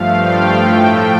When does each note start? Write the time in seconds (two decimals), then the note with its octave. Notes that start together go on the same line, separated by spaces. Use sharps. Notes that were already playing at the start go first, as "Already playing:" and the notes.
Already playing: G2 F3 A3 F5
0.16 G5
0.57 A2 F3 A3